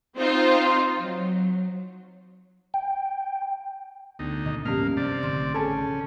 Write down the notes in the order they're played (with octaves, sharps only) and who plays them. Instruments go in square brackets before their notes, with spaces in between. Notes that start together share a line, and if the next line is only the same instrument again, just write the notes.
[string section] C4 D#4 F4 C5
F#3
[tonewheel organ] G5
[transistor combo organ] D2 D#4 [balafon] B3
[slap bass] A#2 D#3 A#3 [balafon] D#5
[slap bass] G#2 F3 G3 [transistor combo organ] A#3 F5 [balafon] B3 C#4 G4
[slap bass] G2 [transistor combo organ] C3 D5
[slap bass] A1 D3 D#3 [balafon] C6
[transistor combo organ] C#4 [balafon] G#4 G#5 B5 [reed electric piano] A4 A5